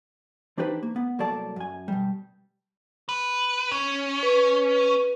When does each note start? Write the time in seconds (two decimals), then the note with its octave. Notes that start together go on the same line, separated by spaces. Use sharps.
0.58 E3 D4 D#4 G4 B4 C5
0.83 A#3
0.96 B3
1.19 C2 F#3 A#3 A4 D5 A5
1.56 F#2 G#5
1.88 B2 G3
3.09 B4
3.71 C#4
4.23 B4